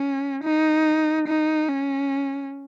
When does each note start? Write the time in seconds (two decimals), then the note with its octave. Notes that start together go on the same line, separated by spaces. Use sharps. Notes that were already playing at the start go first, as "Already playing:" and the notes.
Already playing: C#4
0.44 D#4
1.28 D#4
1.69 C#4